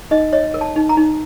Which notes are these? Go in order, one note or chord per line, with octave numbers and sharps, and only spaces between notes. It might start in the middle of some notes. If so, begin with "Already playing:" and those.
D#4 D#5
C#5 D#5
A#4
A5
D#4
A#5
D#4